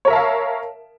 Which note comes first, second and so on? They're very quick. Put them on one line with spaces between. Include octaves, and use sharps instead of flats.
C#5 A#4 E5 A5 F5